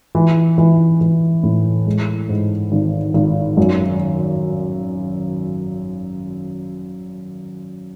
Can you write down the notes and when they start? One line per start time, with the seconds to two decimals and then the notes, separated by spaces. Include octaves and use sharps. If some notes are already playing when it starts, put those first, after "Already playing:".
0.15 E3
0.58 E3
1.01 E3
1.43 A2
1.86 G#3
2.29 G#2
2.72 G#1
3.14 G#1
3.57 F#2